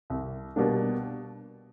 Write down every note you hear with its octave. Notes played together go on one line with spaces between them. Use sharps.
C2
B2 G3 A#3 D4